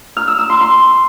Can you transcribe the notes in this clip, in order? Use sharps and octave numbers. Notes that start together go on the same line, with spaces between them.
F6
E6
E6
C6
C6